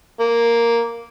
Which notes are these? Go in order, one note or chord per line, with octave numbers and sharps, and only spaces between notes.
A#3